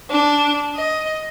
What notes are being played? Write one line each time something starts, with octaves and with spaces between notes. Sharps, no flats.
D4
D#5